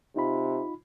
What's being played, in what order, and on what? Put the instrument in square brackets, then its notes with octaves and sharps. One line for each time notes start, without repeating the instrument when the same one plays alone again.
[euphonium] C3 [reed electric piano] D#4 F4 B5